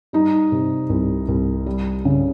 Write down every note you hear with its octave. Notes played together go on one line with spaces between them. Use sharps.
G3 D#4
C3
C2
C2
G3
C#3